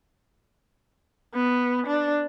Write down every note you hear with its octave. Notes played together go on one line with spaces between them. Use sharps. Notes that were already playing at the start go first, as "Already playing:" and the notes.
B3
D4